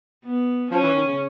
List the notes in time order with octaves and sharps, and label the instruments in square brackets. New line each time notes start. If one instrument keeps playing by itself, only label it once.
[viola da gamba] B3
[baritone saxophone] F3 [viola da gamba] C#4
[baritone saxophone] E3
D#3
C#3